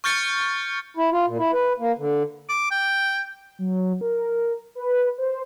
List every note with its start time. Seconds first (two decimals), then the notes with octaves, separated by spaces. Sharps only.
0.04 C#6 F6 G6 A6 C#7
0.97 E4
1.12 F4
1.27 A#2
1.39 E4
1.53 B4
1.80 A#3
1.98 D3
2.49 D6
2.71 G5
3.59 F#3
4.01 A#4
4.75 B4
5.18 C5